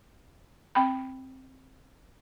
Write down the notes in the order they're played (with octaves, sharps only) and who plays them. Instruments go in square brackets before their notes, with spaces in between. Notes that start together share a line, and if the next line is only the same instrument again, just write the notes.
[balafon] C4 G5 B5